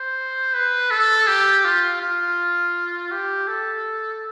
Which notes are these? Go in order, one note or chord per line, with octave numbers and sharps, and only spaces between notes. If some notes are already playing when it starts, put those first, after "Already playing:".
Already playing: C5
B4
A4
G4
F4
F4
G4
A4